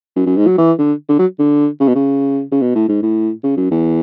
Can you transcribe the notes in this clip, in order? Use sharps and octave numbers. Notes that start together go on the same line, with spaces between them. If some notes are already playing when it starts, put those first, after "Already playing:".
F#2
F#2
G#2
F#3
E3
D3
D3
F#3
D3
C#3
B2
C#3
C#3
B2
A2
G#2
A2
C#3
F#2
E2